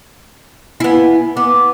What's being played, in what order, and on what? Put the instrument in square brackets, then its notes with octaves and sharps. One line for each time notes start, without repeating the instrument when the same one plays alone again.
[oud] B3 E4 [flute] G#5
[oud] B3 [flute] D6